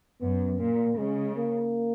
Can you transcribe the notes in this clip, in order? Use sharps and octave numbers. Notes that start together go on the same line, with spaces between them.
F#2 B3
A#2 A#3
C#3 G#3
A#3